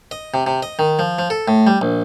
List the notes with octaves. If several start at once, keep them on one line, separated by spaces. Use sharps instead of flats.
D#5
C3
C3
D#5
D#3
F3
F3
A4
A2
G3
A#1